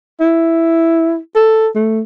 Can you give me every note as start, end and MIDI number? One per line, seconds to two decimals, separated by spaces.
0.20 1.17 64
1.35 1.68 69
1.75 2.01 57